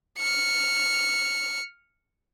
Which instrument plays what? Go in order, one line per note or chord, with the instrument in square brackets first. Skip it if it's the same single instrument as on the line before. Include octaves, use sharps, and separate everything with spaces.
[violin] F6 C#7